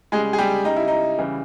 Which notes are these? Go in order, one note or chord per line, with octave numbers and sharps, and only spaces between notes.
C#3 G3 G#3 G#4
G#4
G3 G4
C#3 G3 D#4
E4
D#4
C#3 E3 G3